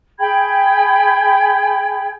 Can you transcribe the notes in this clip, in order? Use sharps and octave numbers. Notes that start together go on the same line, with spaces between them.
G#4 G5 B5 G#6